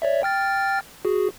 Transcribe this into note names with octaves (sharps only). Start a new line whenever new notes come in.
C#5 D5 E5
G5 F6 A6
F#4 G#4